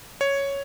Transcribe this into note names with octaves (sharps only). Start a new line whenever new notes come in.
C#5